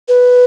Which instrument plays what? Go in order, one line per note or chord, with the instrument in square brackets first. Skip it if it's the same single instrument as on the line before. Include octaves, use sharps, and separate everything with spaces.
[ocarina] B4